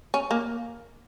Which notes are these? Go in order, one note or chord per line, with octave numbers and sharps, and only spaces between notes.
C#4
A#3